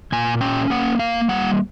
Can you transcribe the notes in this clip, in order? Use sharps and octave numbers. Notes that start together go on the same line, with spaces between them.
A#2 G#5
C#4 G5
A#3 F#5
A#3 F5
G3 F#5